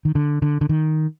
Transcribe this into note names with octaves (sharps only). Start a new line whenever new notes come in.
D#3
D3
D3
D3
D#3